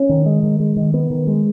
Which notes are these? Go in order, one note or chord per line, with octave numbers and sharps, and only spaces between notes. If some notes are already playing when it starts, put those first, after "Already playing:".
Already playing: C#4
D#3
G#3
D#3
G#3
D#3
B3
D#3
G#3